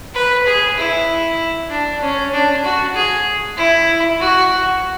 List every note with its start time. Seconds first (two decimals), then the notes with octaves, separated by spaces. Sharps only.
0.15 B4
0.46 G#4
0.77 E4
1.70 D4
2.01 C#4
2.33 D4
2.64 F#4
2.94 G#4
3.57 E4
4.20 F#4